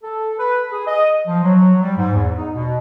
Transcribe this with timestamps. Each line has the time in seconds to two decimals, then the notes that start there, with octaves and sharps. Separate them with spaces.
0.03 A4
0.38 B4
0.71 G#4
0.87 D#5
1.27 F3
1.43 F#3
1.81 G3
1.96 G#2
2.14 E2
2.37 D#4
2.54 B2